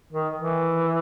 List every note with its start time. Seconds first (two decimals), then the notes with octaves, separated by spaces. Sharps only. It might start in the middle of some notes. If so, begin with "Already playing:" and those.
0.12 D#3
0.36 E3